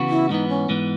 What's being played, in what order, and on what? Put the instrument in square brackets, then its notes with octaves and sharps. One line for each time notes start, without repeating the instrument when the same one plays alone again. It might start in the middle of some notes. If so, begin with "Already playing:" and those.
Already playing: [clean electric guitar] C#3 E3 B3 F#4
[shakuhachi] E4
[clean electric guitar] G#2 E3 B3 [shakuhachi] D#4
[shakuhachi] C#4
[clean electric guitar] G#2 E3 B3